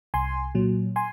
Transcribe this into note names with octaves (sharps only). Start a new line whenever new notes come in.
C2 G#5 C6
A#2 F#3
G#5 C6